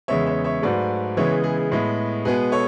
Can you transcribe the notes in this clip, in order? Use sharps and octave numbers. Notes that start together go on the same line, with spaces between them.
E2 C#3 G#3 B3 C#5 E5
C#5 E5
C#5 E5
G#2 F#3 A3 B4 D5
C#3 E3 G#3 B3 C#5 E5
G#4
G#4
G#4
A2 G#3 B3
B2 G#3 B3 G#4 B4
A4 C#5